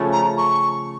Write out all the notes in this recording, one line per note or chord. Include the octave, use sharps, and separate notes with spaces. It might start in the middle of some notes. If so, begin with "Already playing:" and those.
Already playing: C#3 F3 A3 C#4
A#5
C#6